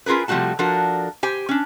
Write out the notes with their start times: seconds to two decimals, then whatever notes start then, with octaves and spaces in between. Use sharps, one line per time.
0.06 C#4 F4 G#4 A#4 B4
0.28 C3 F3 G3 A3 F#4 A5
0.59 F3 D4 F#4 A4 A#4
1.23 G4 C5 G#5
1.49 C#4 D4